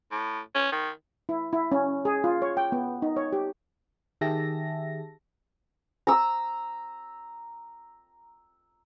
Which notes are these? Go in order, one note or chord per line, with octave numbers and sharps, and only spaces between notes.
A2
C#4
D#3
E4
E4
C#4
G#4
F4
C#5
G5
B3
D#4
C#5
G4
D#3 G4 G#4 E5 A5 A#6
A#5 E6